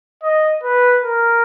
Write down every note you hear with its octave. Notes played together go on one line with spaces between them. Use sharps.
D#5
B4
A#4